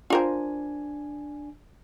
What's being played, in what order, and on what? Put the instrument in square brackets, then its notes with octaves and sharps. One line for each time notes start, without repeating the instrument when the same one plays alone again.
[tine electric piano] D4 G#5 [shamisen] F4 A#4 C5